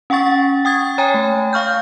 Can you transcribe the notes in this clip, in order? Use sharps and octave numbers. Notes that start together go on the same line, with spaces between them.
C#4 F#5 G5 C#6 A6
G5 D#6 G#6 A6
C#5 G5 G#5 A#5
A3
F5 C#6 F6 G6